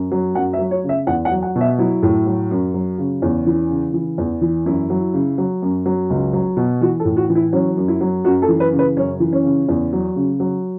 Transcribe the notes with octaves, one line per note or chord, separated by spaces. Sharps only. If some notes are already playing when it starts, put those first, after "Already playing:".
Already playing: F#2
F#3
F#2 F#5
E5
F#3
C#5
C#3
E5
E2 F#5
F#5
F#3
F#5
B2
E5
F#3 E4
A2
F#3
F#2
F#3
C#3
E2 C#4
E3
C#3
E3
E2
E3
F#2 E4
F#3
C#3
F#3
F#2
F#3
C#2
F#3
B2
E3 F#4
A4
A2
F#4
E3
E4
F#3 C#4
F#2
E4
F#3
F#2 F#4
A4
E3
B4
C#3
B4
F#2 C#4
E3
C#4
C#3
E2
F#3
C#3
F#3